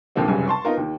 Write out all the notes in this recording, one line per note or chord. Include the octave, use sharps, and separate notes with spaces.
D#2 A#2 D3 F3 A#3 C4
F1 C2 F#2 C#3 G#5
A5 C6 C#6
B3 D#4 F4 A#4
D#2 D#3